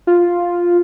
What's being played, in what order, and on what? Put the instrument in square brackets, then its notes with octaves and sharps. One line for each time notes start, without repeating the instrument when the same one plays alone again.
[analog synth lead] F4